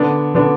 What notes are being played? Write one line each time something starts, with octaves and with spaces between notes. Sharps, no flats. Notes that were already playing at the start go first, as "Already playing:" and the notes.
Already playing: D3 B3 D4
D3 B3 D4